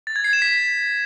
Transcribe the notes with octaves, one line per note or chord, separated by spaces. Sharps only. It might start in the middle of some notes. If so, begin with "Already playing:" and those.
A6
G#6
C7
E7
B6